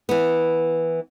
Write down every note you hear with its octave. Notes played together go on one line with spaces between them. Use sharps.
E3 B3